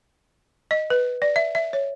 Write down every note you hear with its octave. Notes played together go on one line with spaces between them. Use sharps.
D#5
B4
D5
E5
E5
C#5